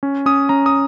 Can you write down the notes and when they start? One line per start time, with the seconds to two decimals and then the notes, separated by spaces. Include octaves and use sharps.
0.03 C#4
0.26 C#4 D#6
0.49 C#4 A#5
0.66 D#6